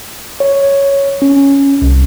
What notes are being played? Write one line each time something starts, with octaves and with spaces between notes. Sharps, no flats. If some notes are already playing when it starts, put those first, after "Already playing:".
C#5
C#4
C2